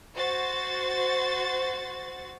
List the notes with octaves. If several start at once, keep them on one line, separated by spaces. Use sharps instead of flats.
F#4 C5 A6